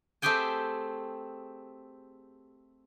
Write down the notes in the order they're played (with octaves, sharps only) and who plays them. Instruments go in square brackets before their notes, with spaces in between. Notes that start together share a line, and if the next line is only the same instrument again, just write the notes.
[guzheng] A3 C4 G4 G#4 G5 G#5